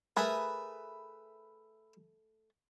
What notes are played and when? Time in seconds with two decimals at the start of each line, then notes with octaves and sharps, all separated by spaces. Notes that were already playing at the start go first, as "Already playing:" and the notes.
0.17 A3 G#4 A#4 B4 E5